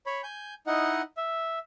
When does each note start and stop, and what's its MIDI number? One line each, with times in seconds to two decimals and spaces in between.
0.06 0.21 73
0.06 0.21 83
0.23 0.54 80
0.23 0.54 91
0.67 1.01 63
0.67 1.01 64
0.67 1.01 75
0.67 1.01 78
1.17 1.59 76